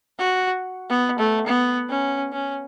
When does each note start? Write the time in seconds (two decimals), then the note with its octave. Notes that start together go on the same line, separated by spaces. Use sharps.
0.19 F#4
0.90 B3
1.19 A3
1.47 B3
1.89 C#4
2.33 C#4